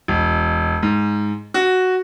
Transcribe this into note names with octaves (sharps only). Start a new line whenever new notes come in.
E1
G#2
F#4